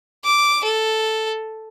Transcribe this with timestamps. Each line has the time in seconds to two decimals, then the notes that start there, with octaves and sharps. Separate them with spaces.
0.24 D6
0.64 A4